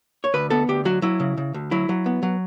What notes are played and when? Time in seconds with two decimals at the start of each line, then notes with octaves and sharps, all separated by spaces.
0.24 C#5
0.34 D2 B4
0.50 B3 A4
0.69 D2 G4
0.85 F#3 F#4
1.02 F#3 E4
1.20 C#3
1.37 C#3
1.54 D2
1.71 F#3 E4
1.89 F#3
2.06 B3
2.23 F#3